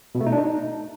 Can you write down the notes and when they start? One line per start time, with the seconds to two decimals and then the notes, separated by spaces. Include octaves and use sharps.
0.15 B2
0.21 A3
0.26 D#4
0.32 D4
0.38 D#4